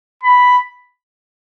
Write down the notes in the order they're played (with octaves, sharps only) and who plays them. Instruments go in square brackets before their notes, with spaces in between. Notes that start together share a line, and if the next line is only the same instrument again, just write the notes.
[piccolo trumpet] B5